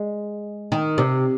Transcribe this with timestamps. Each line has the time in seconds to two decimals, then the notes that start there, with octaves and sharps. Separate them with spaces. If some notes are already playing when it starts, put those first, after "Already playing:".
Already playing: G#3
0.72 D#3
0.98 C3